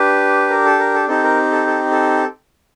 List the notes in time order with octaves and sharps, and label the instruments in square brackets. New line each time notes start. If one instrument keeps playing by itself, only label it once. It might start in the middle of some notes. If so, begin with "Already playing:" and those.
Already playing: [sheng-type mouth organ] D4 G4 B4
A#4
A4
A#4
A4
C4 D#4 G4 A4
A#4
A4
A4
A4